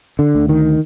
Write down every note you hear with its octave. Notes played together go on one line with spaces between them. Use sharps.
D3
D2
D#3